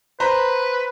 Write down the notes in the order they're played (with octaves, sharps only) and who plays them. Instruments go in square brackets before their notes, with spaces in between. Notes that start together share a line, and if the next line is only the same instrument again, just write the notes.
[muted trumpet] B4 [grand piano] C5 A#5 B5